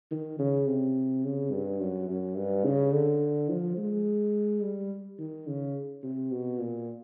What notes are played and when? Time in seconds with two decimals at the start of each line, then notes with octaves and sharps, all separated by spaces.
0.11 D#3
0.39 C#3
0.67 C3
1.25 C#3
1.52 G2
1.81 F#2
2.09 F#2
2.37 G2
2.65 C#3
2.93 D3
3.50 F3
3.77 G#3
4.63 G3
5.19 D#3
5.47 C#3
6.03 C3
6.31 B2
6.60 A#2